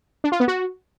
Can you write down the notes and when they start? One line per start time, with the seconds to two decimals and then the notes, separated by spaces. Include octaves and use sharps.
0.24 D4
0.32 F4
0.40 B3
0.48 F#4